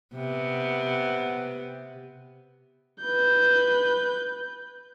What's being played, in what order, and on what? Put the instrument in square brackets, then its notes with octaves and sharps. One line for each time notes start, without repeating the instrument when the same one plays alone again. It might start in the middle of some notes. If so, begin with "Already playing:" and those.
[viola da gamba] C3 B3
[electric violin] B4 G6